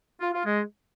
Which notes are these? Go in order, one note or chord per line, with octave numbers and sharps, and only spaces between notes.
F4
F4
G#3